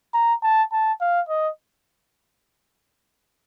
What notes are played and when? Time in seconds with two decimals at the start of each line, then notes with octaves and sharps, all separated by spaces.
0.14 A#5
0.43 A5
0.72 A5
1.01 F5
1.29 D#5